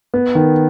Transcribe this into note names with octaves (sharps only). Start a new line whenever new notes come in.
B3
D#3